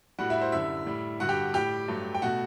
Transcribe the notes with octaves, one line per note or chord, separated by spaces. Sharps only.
A2 G3 F#4 F#5
E4 E5
C5
F#2 D3 G3 E4 E5
A2 G3
G2 D3 G3 F#4 F#5
G4 G5
A2 G3 G4 G5
G2 F#3 A3
G5
B2 A3 F#4 F#5